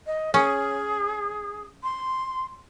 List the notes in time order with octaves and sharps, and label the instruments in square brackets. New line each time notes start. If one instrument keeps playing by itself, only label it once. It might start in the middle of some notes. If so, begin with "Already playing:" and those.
[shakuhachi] D#5
[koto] C#4 [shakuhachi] G#4
[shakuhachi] C6